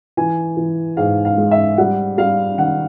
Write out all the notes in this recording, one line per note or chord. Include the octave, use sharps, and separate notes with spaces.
E3 G#5
E3
G#2 F5
F5
G#3
E5
G3 F#5
G3 F5
D#3 F#5